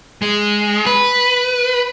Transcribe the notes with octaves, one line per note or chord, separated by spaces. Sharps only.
G#3
B4